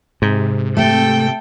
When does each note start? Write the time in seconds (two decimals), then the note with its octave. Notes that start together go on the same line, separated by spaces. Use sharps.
0.22 G#2 C3
0.77 A3 A4 G5